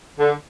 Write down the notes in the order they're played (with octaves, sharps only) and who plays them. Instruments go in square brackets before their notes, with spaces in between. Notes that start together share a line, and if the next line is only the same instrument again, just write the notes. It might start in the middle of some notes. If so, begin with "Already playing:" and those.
[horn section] D3